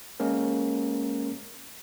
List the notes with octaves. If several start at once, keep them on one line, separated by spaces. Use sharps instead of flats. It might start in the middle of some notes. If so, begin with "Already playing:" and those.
G#3 A#3 C#4 A#4